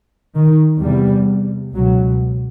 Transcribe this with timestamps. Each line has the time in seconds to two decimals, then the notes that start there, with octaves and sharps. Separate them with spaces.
0.35 D#3
0.82 E2 C3 G3
1.74 C#2 B2 F#3